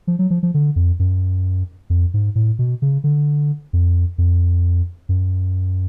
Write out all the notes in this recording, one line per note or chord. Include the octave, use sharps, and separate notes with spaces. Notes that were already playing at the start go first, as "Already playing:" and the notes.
F3
F#3
F3
F3
D3
F2
F#2
F2
G#2
A2
B2
C#3
D3
F2
F2
F#2